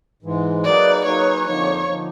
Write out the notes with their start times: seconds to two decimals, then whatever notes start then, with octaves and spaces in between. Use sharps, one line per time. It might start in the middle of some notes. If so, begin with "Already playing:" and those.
0.23 G#2 E3 G#3
0.64 F#3 A#3 D#4 G#4 B4 D5
1.05 F#3 A#3 D#4 G#4 B4 C#5
1.46 F2 D3 F3 A#3 D#4 C#5
1.87 D3 F3 A#3 D#4